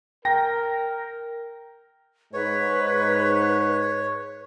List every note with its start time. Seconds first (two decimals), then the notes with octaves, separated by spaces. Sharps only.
0.25 A#4 G5 A#6
2.34 G#2 B4 C#5